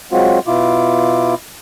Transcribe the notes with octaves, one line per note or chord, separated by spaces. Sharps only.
F#3 G#3 C4 F4 F#4
B2 E4 F4 D6